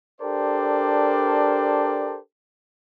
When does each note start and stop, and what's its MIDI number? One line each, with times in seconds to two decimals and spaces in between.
0.21 2.18 62
0.21 2.18 67
0.21 2.18 69
0.21 2.18 70
0.21 2.18 72
0.21 2.18 74